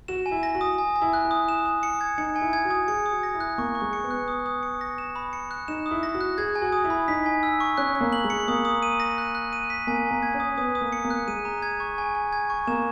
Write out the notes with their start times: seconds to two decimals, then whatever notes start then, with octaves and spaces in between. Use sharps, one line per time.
0.08 F#4 E7
0.26 G#5
0.31 E4
0.43 A#6
0.55 F#4
0.61 D#6
0.78 G#5
0.96 G#5
1.02 E4
1.13 F#6
1.25 E4
1.31 D#6
1.49 E7
1.66 D#6
1.83 C#7
2.01 G#6
2.18 D#4 C#7
2.36 G#5
2.41 E4
2.53 G#6
2.65 F#4
2.70 D#6
2.88 G#4 C#7
3.06 D#6
3.12 F#4
3.23 A#6
3.35 E4
3.40 F#6
3.58 A#3 C#6
3.75 C#6
3.82 G#3
3.93 C#7
4.04 B3
4.10 F#6
4.28 D#6
4.46 D#6
4.63 C#7
4.81 A#6
4.98 E7
5.16 B5
5.33 C#7
5.51 F#6
5.68 D#4 E7
5.86 D#6
5.91 E4
6.03 A#6
6.15 F#4
6.21 F#6
6.38 G#4 G#6
6.55 G#5
6.62 F#4
6.72 D#6
6.84 E4
6.90 B5
7.08 D#4 B6
7.26 G#5
7.43 E6
7.60 C#6
7.78 C#4 F#6
7.95 F#6
8.01 A#3
8.13 F#7
8.24 G#3
8.30 C#7
8.48 A#3 D#6
8.65 D#6
8.83 D#7
9.00 A#6
9.18 F#6
9.35 F#6
9.53 D#7
9.70 B6
9.87 A#3 G#5
10.06 G#5
10.11 A#3
10.22 G#6
10.34 C#4
10.40 D#6
10.58 B3 D#6
10.75 D#6
10.81 A#3
10.92 C#7
11.05 A#3
11.10 F#6
11.27 G#3 D#7
11.45 A#5
11.62 G#6
11.80 C#6
11.98 G#5
12.15 G#5
12.33 G#6
12.50 C#6
12.67 A#3 E7